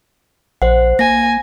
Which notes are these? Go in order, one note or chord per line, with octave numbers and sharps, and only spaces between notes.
A#1 C5 F#5
A#3 G#5 A#6